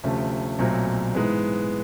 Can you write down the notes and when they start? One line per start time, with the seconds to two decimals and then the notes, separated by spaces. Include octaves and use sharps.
0.04 D2 C3 F3 A3 C#4
0.59 B1 A#2 F#3 A3 C4
1.15 G#2 E3 G#3 B3